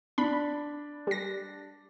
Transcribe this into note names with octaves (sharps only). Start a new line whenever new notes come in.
D4 B5
G3 A#6